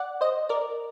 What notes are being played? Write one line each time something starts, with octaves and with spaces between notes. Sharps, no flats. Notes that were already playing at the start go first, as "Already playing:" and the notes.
Already playing: D5 F#5
C5 D#5
A#4 D5